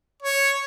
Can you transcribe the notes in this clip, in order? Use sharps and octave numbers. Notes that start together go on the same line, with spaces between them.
C#5